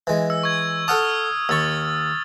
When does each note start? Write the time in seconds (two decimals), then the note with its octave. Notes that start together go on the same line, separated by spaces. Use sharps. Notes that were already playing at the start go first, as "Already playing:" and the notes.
0.07 E3 G#3
0.30 E6
0.43 C#6 G#6
0.88 A4 F#5 A5 D#6 F6
1.49 D#2 C#6 E6 A6